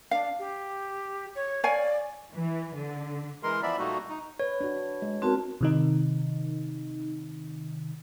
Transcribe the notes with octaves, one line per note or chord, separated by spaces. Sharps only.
D4 F5
G4
C#5
C#5 D5 F5 G#5
E3
D3
E3 G#3 A#4 C6
E3 F3 B3 D5 E5 B5
A#2 G3 A3 A#3 D#4 F#4
D#4
B4 C#5
D4 F#4
G#3
B3 C4 D#4 F#4 A#4 A5
C3 D#3 D#4